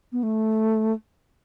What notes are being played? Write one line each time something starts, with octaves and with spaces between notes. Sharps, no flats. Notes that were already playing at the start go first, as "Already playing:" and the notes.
B3
A3